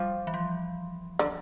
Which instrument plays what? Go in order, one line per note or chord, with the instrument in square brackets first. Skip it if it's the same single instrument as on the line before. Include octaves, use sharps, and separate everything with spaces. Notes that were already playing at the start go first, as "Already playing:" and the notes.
Already playing: [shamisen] F3 [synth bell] G3
[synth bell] E3
F3
[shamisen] D3